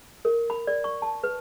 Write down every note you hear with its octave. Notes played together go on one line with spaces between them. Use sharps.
A#4
B5
D5
C#6
A5
B4